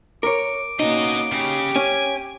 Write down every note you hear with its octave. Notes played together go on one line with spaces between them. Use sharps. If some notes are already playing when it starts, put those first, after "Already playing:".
A#4 C#5 D6
A#3 B3 C#4 D#4 F#4 D#5
C#3 G4
C#4 G#5